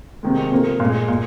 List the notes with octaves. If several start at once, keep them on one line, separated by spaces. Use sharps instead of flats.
C3 D#3 G#3
C3 F3 A#3
A#2 G#3
A#2